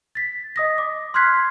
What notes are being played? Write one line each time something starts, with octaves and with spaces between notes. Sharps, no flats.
A6 B6
D#5 D#6 A#6
D6
C6 F6 F#6 G#6 B6 C7